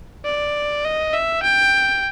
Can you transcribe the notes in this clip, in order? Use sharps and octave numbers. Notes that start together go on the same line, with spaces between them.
D5
D#5
E5
G5